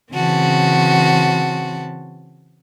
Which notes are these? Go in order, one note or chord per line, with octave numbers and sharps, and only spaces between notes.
C#3 E3 C4 F#4 A5